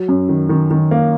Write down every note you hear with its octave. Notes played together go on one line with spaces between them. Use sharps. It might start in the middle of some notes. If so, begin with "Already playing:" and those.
Already playing: F#3
F#2
D#3
D#3
D#3
A#3